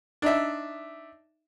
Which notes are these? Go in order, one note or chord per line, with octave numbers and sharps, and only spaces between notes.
D4 D#4 E5